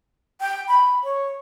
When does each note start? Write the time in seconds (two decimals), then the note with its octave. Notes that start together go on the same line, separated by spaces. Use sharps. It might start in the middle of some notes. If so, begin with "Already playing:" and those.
0.41 G5
0.68 B5
1.04 C#5